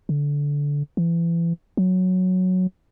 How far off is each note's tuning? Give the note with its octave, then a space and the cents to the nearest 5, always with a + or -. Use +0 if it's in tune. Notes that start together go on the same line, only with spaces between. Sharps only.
D3 -20
E3 +35
F#3 -5